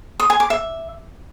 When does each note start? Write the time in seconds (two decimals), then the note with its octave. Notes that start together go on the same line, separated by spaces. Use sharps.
0.20 D#6
0.30 G#5
0.40 D6
0.50 E5